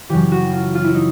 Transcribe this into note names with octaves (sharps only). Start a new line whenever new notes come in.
F#2 C#3 E3 G4
F#4
F4
F4
E4
D#4